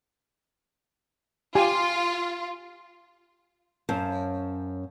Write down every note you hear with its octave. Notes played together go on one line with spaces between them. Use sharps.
F4 G4 G#5
F#2 C#4 C5 F5 A5